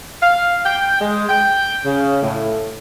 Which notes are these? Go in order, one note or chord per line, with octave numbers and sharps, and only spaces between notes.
F5
G5
G#3
G5
C#3
A2